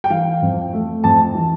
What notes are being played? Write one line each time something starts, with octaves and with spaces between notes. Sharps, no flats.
G5
E3 F5
F2
A3
F2 A5
E3